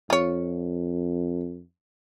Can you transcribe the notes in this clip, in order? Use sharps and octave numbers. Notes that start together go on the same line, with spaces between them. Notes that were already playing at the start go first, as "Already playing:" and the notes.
F2 F4 C#5